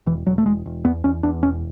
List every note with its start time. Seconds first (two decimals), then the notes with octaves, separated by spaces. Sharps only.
0.06 E1 E3
0.27 E1 F#3
0.38 A3
0.46 E1 G#3
0.66 E1
0.85 E2 B3
1.04 E2 C#4
1.23 E2 D4
1.43 E1 C#4